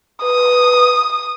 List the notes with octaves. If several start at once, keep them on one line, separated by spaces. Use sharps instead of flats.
B4 D#6